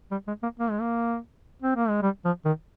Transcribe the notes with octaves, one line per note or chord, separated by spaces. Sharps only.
G3
G#3
A#3
A#3
G#3
A#3
C4
A#3
G#3
G3
F3
D#3